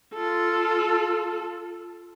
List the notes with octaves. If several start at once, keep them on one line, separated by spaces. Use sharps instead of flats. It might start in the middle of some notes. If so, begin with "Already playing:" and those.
F4 A4